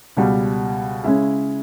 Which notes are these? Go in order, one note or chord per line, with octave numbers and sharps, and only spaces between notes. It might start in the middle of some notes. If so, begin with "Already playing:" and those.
C#2 B2 G3
C#3 G#3 C#4 E4 G#4